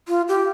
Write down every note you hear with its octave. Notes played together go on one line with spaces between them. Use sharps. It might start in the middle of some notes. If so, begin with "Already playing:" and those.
F4
G4